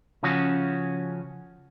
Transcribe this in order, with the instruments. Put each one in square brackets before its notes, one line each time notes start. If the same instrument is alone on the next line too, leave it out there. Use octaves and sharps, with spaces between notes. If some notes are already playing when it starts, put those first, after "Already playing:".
[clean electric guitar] C#3 F3 C#4 F#4